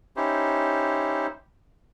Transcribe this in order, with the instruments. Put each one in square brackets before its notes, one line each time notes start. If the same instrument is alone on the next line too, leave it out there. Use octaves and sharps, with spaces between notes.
[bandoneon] C#4 D#4 E4 G4 C5